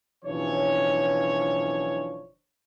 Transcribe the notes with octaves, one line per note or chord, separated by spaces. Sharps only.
F#1 B1 E3 F3 D4 C#5